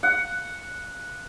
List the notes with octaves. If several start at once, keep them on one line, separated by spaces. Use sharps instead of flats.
F#5